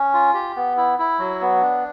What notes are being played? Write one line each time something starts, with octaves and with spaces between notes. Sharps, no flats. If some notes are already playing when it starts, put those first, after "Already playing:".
Already playing: C#4
F4
G4
B3
E4
E4
F#3
B3
D4